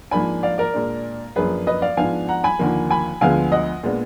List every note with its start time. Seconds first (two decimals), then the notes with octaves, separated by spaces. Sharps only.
0.11 G#2 F3 A#3 D4 G#5 B5
0.43 D5 F5
0.58 A#4 D5
0.74 A#2 G#3 D4
1.36 F#2 F3 A#3 D4 G#4 B4
1.67 B4 D#5
1.82 D5 F5
1.97 G#2 F3 B3 D4 F5 G#5
2.29 F#5 A#5
2.44 G#5 B5
2.59 D#2 D3 F3 A#3
2.91 G#5 B5
3.21 D2 D3 F3 G#3 B3 F5 G#5
3.52 D#5 F#5
3.83 A#2 G#3 B3 D4